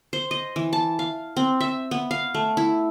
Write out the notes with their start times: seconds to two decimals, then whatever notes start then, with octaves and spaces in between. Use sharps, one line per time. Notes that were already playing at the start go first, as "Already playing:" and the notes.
0.13 C5
0.31 D#5
0.56 E3
0.73 A5
0.99 F5
1.37 C4
1.61 E5
1.91 B3
2.11 F5
2.34 A3
2.57 E4